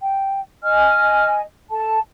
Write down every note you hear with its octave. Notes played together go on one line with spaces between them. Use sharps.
G5
D#5 G#5 F6
A4 A5